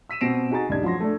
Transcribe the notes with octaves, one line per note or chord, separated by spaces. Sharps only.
E6 B6 D#7 E7
B2 C4 A#6 C7 D7 E7
D#4 F#4 G#4 A#5 A6
D#1 C#2 G2 D4 D#4 G#6
F3 F#3 C6 A#6
A3 D4